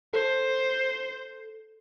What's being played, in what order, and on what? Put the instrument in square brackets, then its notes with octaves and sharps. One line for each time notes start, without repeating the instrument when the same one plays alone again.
[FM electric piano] A4 [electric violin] C5